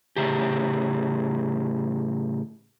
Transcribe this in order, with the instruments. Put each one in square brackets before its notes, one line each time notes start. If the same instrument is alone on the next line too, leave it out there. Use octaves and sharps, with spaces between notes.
[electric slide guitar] A2 C#3 G4